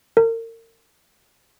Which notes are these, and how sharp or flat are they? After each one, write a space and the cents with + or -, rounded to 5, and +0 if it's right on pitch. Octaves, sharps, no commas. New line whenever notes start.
A#4 -35